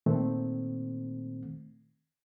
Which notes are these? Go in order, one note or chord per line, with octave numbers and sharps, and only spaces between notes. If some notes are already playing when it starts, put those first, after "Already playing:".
A#2 D#3 A3 C4